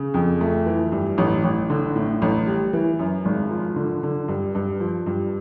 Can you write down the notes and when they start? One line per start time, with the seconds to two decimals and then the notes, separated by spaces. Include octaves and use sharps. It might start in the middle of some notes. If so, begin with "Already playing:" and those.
Already playing: C#3
0.14 F2
0.41 A3
0.66 E3
0.92 G2
1.18 A1
1.44 A1
1.70 D3
1.96 A2
2.22 A1
2.47 G3
2.73 E3
2.99 F#2
3.25 G#1
3.51 F3
3.76 D3
4.03 D3
4.28 G2
4.55 G2
4.80 F3
5.06 G2